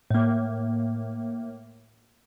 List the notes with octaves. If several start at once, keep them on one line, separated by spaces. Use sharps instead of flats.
A2 A#3